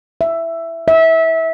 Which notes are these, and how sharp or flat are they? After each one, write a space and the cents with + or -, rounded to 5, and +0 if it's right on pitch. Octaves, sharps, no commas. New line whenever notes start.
E5 +10
E5 -20